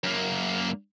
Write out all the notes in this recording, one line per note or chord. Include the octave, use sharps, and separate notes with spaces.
F#2 A#3